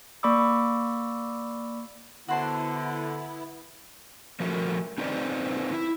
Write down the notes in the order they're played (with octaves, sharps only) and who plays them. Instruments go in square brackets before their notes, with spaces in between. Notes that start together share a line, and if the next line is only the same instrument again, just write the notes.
[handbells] A#3 D5 B5 C#6 D6 E6
[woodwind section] D3 [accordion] B3 E4 [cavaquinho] F#4 C5 A5
[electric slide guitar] F3 A3 F#4 A#4
C4 D#4 B4 C5 D5
E4